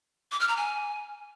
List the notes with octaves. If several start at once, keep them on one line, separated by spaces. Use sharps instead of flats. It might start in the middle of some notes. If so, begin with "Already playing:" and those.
D6
F6
A#5
G#5